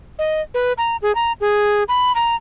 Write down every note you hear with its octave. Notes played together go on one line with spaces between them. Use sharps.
D#5
B4
A#5
G#4
A#5
G#4
B5
A#5